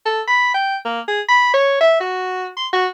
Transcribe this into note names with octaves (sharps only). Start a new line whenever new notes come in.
A4
B5
G5
A#3
G#4
B5
C#5
E5
F#4
C6
F#4